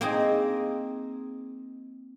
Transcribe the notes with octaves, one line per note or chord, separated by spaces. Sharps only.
A#3 C4 D#4 G#4